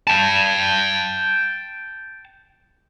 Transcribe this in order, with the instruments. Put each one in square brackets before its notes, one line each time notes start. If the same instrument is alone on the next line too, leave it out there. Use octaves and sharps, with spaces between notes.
[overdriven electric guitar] G5 A5